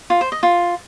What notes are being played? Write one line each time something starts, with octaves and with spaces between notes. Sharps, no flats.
F4
C5
D#5
F4